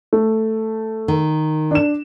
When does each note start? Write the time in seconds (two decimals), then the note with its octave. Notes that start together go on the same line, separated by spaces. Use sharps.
0.13 A3
1.08 D#3
1.71 D4 E7